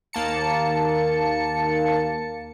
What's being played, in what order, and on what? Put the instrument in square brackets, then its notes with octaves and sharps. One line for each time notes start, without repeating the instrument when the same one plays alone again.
[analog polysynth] D#2 A#3 A5 C#7